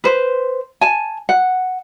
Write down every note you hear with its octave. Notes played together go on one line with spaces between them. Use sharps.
B4 C5
G#5 A5
F#5